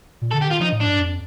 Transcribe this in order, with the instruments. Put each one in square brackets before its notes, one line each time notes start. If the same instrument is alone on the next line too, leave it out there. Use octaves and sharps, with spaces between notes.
[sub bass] A#2
[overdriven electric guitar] A4
[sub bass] D3
[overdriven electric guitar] G4
[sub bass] D#3 [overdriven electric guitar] F4
[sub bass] F3 [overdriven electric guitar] D#4
[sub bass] A2
[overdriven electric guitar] D4
[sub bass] G2
F2